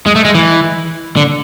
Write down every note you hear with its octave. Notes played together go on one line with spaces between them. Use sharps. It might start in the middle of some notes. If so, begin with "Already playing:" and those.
G#3
A3
G#3
E3
D3